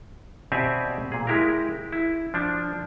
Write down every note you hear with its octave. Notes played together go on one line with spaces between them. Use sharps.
B2 C4 G4 D5 E5 G#5
A#2 G#4
G#3 E4 G4 A#4
E4
F3 D4